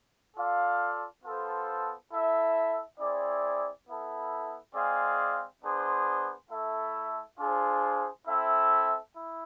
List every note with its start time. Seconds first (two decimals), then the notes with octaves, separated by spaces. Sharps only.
0.36 F4 A4 D5 F5
1.24 B3 F4 A4 C5
2.11 E4 A4 E5
2.99 C4 E4 G#4 D5
3.88 B3 E4 A4
4.75 G#3 C4 G#4 D5 F5
5.63 B3 D4 G#4 C5
6.51 A3 E4 A4 E5
7.39 D4 F4 G#4 C5
8.27 C4 E4 A4 E5
9.15 E4